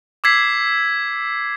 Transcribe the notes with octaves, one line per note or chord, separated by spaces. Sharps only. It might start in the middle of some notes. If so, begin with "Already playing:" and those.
D6 E6 G#6 B6 C7